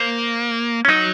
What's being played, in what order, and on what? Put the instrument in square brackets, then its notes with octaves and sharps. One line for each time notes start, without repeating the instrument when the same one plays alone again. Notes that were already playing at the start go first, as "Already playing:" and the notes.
Already playing: [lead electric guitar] A#3 [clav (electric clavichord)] C5
[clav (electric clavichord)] C#4
[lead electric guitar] F#3 [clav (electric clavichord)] D#4